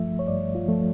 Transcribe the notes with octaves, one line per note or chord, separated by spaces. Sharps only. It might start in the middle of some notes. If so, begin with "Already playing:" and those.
Already playing: G2 F3 A3 E5
C#5
G2 D5
F4
F3 A3